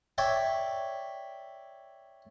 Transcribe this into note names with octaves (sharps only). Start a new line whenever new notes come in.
C#5 D5 E5 G5